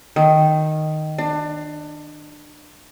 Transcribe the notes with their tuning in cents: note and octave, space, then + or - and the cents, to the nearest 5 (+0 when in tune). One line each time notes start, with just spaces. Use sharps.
D#3 -5
D4 +25